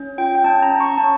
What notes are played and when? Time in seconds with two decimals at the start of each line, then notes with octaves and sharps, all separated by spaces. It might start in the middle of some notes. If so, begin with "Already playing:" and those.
Already playing: C#4
0.18 F4 G5
0.35 G5
0.44 C#4 A5
0.63 A#5
0.72 C#4
0.80 C#6
0.98 C#4 A5